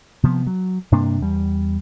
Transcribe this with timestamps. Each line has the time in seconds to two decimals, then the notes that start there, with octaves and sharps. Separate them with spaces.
0.23 C3 F3 B3
0.47 F#3
0.92 G2 C3 A#3 D4
1.22 E2 G3